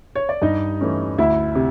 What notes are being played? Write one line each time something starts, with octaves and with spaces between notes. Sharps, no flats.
C#5
D5
G2 D#4 D#5
E3 A3 C#4
D2 E4 E5
C3